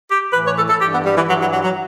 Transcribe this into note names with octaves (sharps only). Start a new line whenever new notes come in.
G4
A2 E3 B4
C#5
A4
A4
G2 E3 G4
B3
G3
E3
G2 E3 F#3
F#3
F#3
F#3